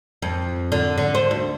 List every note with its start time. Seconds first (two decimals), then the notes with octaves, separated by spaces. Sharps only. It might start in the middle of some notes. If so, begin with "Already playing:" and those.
0.22 F2
0.72 D3
0.98 D3
1.15 C5
1.31 D2